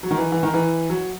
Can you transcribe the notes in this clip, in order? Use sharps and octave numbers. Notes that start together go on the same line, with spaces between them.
F#3
D#3
E3
E3
D#3
E3
F#3